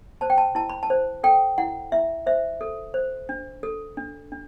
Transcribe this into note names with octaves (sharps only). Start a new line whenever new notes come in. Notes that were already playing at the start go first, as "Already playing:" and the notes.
C5 A5
G5
A5
E4 A5
B5
A5
C5
A4 G5
E4 F#5
E4 E5
C5 E5
A4
C5
D4
A4
D4
D4